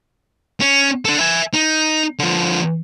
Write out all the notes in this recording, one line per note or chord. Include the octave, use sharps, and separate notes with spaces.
C#4
D4 A4
E5 G#5
D#4
D3 F3